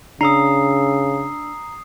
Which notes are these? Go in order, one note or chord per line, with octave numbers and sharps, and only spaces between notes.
C#3 D4 A#5 D#6 E6 C7